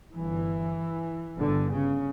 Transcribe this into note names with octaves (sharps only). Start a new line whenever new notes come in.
G1 G2 E3
G1 G2 D3
C#3